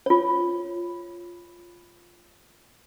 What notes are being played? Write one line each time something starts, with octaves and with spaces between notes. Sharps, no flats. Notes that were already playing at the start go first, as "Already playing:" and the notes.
F4 C#5